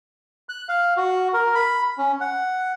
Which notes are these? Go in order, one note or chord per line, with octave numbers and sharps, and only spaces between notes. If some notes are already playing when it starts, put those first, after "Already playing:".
F#6
F5
F#4
A#4
B5
C#4
F#5